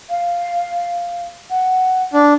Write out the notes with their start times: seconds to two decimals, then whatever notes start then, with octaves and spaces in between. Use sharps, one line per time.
0.10 F5
1.50 F#5
2.13 D4